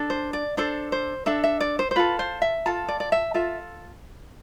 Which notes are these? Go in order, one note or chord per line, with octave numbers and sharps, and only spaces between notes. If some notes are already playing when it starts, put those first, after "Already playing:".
Already playing: D4 A4
C5
D5
D4 A4 C5
C5
D4 A4 E5
E5
D5
C5
C5
F4 A4 B4
C5
E5
F4 A4 A5
D5
D5
E5
F4 A4 E5